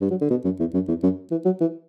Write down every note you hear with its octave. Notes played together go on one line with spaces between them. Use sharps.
G2
F#3
D3
B2
F#2
E2
F#2
E2
F#2
E3
F#3
E3